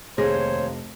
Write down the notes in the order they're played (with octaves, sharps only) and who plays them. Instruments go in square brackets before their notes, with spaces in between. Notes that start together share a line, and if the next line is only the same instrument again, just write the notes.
[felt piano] F1 A#6 [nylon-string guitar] D#2 G#4 [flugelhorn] C5 [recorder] C#5